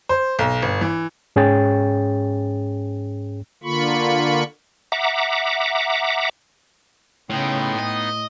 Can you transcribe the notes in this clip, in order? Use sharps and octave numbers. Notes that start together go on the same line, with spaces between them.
C5
B1
G1
E3
G#2 C#4 G#4 C#5 G5 A6
D3 A#3 F4 B5 C#6
E5 F#5 A#5 D6
A2 C#3 B3 D#4 G5 C6
A2 D#5